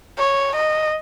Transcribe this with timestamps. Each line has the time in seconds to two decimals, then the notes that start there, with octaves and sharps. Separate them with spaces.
0.18 C#5
0.55 D#5